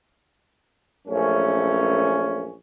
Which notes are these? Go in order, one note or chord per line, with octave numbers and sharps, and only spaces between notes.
A#1 F#2 A3 C#4